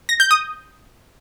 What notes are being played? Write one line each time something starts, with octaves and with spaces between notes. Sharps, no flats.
A#6
G6
D#6